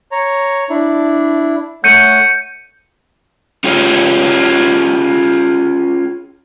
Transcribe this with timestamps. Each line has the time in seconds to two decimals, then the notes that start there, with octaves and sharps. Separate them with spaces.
0.12 C#5 A#5
0.70 D4 E4
1.84 A3 C#5 F#5 G6 C#7 D#7
3.64 C#4 F4 G4 G#4 C#5